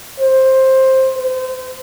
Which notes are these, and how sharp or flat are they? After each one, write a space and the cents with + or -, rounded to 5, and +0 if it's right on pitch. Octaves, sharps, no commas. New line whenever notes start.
C5 +10
C5 -30